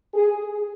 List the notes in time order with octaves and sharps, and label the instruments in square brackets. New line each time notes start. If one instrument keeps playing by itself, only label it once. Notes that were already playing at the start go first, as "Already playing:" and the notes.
[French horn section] G#4